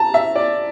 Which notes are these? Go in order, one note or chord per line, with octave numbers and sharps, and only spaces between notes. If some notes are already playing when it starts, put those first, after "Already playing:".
Already playing: A5 A#5
E5
D5